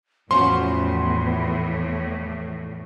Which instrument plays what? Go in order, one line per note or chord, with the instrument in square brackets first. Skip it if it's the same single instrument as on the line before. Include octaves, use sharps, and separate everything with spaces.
[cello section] E2 A2 [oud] F3 C#4 F#4 [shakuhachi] B3 [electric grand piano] C6